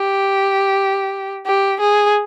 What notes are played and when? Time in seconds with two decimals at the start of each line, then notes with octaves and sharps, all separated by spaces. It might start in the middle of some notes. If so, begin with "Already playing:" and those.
Already playing: G4
1.46 G4
1.80 G#4